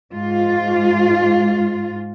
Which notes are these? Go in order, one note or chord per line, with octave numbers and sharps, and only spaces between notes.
G#2 F4